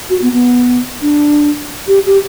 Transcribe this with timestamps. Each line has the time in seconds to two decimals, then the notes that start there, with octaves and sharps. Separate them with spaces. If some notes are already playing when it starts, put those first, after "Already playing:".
0.10 F#4
0.22 B3
0.33 B3
1.02 D4
1.88 G4
2.05 G4